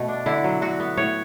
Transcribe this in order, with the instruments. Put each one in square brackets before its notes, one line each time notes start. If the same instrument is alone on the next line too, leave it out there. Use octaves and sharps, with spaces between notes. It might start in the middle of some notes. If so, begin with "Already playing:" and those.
Already playing: [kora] B2 A3
D4
D3 E4
F#3
D3 F#4
B3
A2 C#5